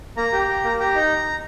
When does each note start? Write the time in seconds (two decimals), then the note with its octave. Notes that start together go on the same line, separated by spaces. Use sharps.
0.17 A#3 A#5
0.33 G4
0.48 G4
0.64 A#3
0.80 G4 A#5
0.95 D#4